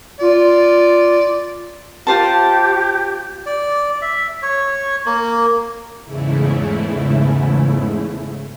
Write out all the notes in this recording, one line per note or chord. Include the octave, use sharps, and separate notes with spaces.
F4 D5
F4 G4 C5 A5
D5
E5
C#5
A#3
E2 G#2 C#3 A3 E4